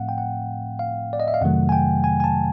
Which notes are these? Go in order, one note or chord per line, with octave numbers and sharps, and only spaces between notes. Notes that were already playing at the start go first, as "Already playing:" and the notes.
Already playing: A2 F3 A3 C4 F5 F#5
G5
F#5
F5
D5
D#5
E5
F5
F2 C3 D#3 F#3 A3 F#5
G#5
G5
G#5
G#5
A5